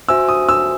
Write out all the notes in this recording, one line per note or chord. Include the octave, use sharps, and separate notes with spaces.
F#4 C5 E5 G#5 E6
D#6
E6